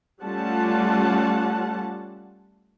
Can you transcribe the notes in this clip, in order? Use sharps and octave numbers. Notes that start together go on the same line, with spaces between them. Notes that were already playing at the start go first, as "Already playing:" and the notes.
G3 A3 C#4 F4 F#5 A5